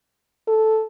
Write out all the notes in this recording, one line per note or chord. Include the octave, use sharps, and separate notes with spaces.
A4